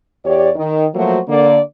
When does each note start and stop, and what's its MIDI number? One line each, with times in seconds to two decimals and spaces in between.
0.25 0.50 40
0.25 0.50 67
0.25 0.50 73
0.25 0.50 74
0.56 0.87 51
0.95 1.19 53
0.95 1.19 54
0.95 1.19 57
0.95 1.19 58
0.95 1.19 66
0.95 1.19 72
1.28 1.60 50
1.28 1.60 58
1.28 1.60 74